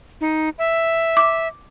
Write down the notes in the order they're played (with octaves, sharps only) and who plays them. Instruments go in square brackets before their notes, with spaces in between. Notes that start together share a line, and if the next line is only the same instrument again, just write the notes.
[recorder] D#4
E5
[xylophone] D6